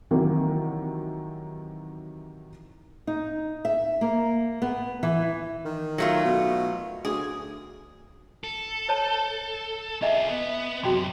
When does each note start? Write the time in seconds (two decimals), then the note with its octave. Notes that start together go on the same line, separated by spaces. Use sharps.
0.11 C3 D#3 E3 F#3 A#3
3.07 D#4
3.65 E5
4.01 A#3
4.62 B3
5.03 E3
5.65 D#3
5.98 F#3 A3 F4
6.25 B2
7.05 D2 G#4
8.44 A4
8.89 C5 C#5 A5
10.02 F4 G#4 D#5 E5 G#5
10.30 B3
10.84 F#2 C3 F#4 G5 C6